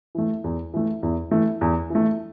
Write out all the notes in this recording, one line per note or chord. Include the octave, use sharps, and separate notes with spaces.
E3 A3
E2
E3 A3
E2
E3 A3
E2
E3 A3